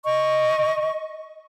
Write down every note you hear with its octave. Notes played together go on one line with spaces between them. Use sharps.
D#5 C#6